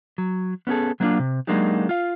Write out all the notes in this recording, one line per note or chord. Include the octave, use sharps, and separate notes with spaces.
F#3
B3 C#4 F#4 G#4 A4
F#3 A#3 B3 C#4 D4 F4
C3
F#3 G#3 A#3 D4 D#4 G4
F4 F5